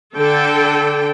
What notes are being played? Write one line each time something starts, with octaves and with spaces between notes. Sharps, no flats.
D3 A4 G5